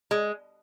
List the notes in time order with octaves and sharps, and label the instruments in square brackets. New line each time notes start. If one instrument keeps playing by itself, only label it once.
[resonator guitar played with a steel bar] G#3